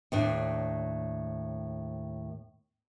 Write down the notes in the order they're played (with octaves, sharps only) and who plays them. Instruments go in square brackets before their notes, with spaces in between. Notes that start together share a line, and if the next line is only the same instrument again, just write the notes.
[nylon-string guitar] D#2 A2 D4